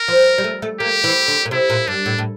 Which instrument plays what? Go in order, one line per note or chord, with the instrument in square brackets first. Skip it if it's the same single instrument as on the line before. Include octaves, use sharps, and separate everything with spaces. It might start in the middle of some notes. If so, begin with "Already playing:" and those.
Already playing: [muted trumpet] A#4
[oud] F3
G3
A3
A3
[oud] A#3 [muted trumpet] G4
[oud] E3
D3
A#2
[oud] C3 [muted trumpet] E4
[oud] A#2
[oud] G2 [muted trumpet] D4
[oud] A2
A2